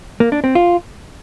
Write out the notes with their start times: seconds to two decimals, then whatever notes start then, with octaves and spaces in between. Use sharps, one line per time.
0.20 A#3
0.32 D4
0.44 C4
0.55 F4